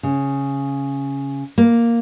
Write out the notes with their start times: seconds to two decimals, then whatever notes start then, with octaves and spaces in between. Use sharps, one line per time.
0.03 C#3
1.58 A#3